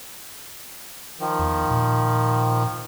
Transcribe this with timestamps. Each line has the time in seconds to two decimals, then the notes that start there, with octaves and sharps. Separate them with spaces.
1.20 D#3 F3
1.39 E2
1.70 A#2